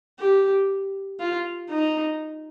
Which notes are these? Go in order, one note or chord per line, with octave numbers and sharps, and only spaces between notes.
G4
F4
D#4